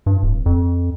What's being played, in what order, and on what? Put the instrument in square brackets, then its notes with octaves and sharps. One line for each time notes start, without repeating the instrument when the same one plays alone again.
[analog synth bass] G2
D1
F2